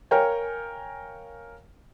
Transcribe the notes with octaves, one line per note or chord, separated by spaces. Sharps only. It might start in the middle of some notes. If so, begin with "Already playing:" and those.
A#4 C#5 F5 G5 G#5